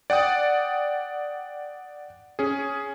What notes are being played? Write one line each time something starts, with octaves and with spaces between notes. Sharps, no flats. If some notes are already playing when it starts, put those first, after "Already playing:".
D5 F#5 G5 D#6
C#4 G#4